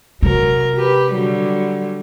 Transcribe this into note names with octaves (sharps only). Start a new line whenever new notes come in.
C3 F#3 A#4
G4 B4
D3 F#3 G3